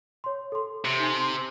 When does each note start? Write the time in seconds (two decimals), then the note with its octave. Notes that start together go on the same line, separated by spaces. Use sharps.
0.24 C#5 C6
0.52 A4 C6
0.85 C3
1.00 D#4 G#5
1.16 C6